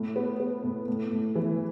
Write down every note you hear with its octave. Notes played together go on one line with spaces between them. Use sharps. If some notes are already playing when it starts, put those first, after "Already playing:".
Already playing: A2
B3
B3
A2
A2
A2
E3